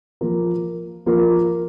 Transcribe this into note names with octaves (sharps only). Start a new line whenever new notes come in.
F3 A#3 F4 A#4
F3 A#3 F4 A#4